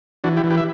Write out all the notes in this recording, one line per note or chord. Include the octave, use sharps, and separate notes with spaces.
E3 D4 F#4
E4 G4
E3
G4 B4
E5